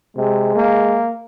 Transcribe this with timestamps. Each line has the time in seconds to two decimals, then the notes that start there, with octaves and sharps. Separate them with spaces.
0.17 C3 G#3
0.55 A#3